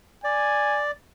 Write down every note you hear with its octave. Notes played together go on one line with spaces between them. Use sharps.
D5 G#5